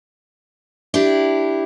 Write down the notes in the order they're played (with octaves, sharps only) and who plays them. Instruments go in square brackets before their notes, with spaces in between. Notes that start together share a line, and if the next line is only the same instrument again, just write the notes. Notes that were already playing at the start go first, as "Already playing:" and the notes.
[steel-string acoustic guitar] D4 E4 G4